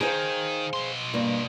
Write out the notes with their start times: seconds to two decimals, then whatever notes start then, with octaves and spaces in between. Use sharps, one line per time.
0.01 D#3 G#4 C5 F5
0.74 B2 C6
1.14 G2 A#3